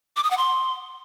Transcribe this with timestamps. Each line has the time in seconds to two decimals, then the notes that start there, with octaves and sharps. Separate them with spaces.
0.17 D6
0.24 D#6
0.31 F#5
0.37 C6